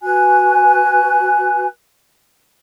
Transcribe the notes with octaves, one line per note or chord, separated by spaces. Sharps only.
F#4 B4 G#5 F#6